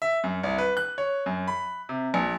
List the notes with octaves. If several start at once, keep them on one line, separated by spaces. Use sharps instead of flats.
E5
F#2
C2
B4
F#6
C#5
F#2
B5
C3
A#1